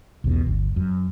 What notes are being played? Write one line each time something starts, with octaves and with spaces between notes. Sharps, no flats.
B1 E2 B2
G1 D2
F#2